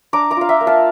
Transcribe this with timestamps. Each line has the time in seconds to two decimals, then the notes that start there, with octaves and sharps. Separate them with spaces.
0.13 D4 A#5 D6
0.31 A#5 D6
0.37 F4 F5
0.49 E5 G5
0.61 A#3
0.67 F5 A5